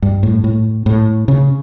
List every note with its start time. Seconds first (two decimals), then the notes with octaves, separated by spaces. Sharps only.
0.02 G2
0.23 A2
0.44 A2
0.86 A2
1.28 C#3